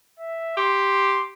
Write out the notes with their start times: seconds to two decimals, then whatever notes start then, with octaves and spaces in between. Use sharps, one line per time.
0.19 E5
0.57 G4 C6